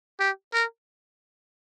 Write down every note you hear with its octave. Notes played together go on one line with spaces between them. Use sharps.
G4
A#4